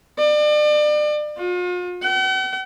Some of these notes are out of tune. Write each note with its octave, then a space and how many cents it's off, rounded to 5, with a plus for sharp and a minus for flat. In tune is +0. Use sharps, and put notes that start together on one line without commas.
D5 +35
F4 +40
F#5 +45